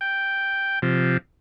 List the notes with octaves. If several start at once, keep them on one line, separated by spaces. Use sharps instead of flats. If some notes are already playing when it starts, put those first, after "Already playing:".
G5
C3 F3